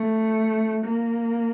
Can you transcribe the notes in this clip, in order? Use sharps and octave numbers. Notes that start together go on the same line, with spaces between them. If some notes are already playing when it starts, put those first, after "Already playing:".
Already playing: A3
A#3